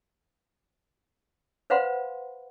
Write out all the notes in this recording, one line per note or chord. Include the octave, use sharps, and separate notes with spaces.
B4 C5 F5 F#5 B5 C6